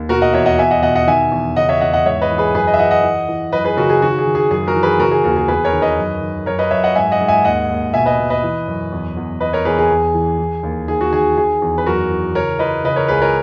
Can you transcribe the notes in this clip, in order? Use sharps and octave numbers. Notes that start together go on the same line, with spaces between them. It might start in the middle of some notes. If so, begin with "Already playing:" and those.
Already playing: D#2
B2 F#4 A#4
D#5 F#5
E2 C#5 E5
D#5 F#5
E2 E5 G#5
D#5 F#5
B2 D#5 F#5
D#5 F#5
D#3 E5 G#5
E2
C#3 D#5 F#5
C#5 E5
E2 D#5 F#5
D#5 F#5
G#2 C#5 E5
B4 D#5
E3
G#4 B4
F#2 G#4 B4
B4 D#5
E5
E3 D#5 F#5
D#5 F#5
E3
E3
F#2 B4 D#5
G#4 B4
C#3 F#4 A#4
G#4
D#3 F#4
G#4
D#3
G#4
F#2 G#4
F#4 A#4
E3
G#4 B4
C#3 F#4 A#4
G#4
D#2 F#4 A#4
G#4
E2 G#4 B4
A#4 C#5
D#3
B4 D#5
F#2
D#3
F#2 A#4 C#5
B4 D#5
F#2 C#5 E5
D#5 F#5
G#2 E5 G#5
D#5 F#5
G#2
E5 G#5
D#2 D#5 F#5
D#2
B2 E5 G#5
B4 D#5
B2
B4 D#5
E3
F#2
E2
E2
E2 B4 D#5
A#4 C#5
E2 G#4 B4
G#4
E2
E3
E3
D#2
D#3 G#4
F#4
D#3 G#4
D#3 G#4
E2
B4
F#2 F#4 A#4
E3
C#3 A#4 C#5
E3 B4 D#5
C#3 B4 D#5
A#4 C#5
C#2 G#4 B4
A#4 C#5